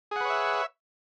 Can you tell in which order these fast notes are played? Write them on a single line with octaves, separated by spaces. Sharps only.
G#4 F#5 B4 C#5 E5